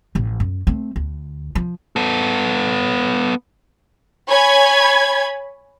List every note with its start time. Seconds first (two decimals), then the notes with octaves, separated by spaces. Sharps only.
0.15 A1 F3
0.40 F#2
0.67 A3 C4
0.96 D2
1.55 F3
1.96 B3 A4
4.30 C#5 G#5 B5 G#6